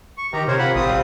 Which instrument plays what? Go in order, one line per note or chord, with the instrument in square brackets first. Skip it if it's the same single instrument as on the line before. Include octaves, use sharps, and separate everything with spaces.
[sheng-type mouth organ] C#6
[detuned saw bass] D#3 [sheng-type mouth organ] G4 A#5
[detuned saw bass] C3 [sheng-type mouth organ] A#4 C5 C#5
[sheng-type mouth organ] F4 F#5 B5
[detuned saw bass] A1 [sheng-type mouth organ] C4 F4 D#6
[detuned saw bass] G3